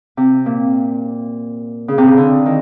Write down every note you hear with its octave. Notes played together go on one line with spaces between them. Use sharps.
C3
A#2
C#3
C3
C#3
D3
D#3